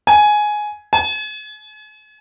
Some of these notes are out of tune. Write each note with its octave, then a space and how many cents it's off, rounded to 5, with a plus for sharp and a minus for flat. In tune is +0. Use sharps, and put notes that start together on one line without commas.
G#5 +10
G#5 +40